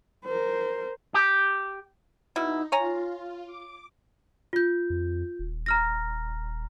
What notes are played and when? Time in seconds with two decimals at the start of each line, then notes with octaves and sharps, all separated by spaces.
0.24 A#4 C5
1.14 G4
2.36 B2 D#4 E4
2.72 F4 C#5 G#5 A#5
3.46 D6
4.53 F4 G6
4.90 F2
5.39 D#1
5.66 A#5 F6 A#6